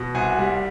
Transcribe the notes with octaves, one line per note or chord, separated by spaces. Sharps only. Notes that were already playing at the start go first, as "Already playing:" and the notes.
Already playing: B2
C2 F#5 G#5
G3